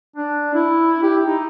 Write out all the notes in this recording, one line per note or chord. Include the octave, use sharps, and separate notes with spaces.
D4
E4
G4
D#4